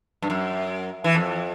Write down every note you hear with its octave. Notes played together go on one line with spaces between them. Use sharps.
G2
F#2
E3
F2